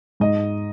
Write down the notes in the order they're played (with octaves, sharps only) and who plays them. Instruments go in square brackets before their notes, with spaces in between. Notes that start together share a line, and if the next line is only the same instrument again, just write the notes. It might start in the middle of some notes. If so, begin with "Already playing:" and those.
[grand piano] G#2 D#5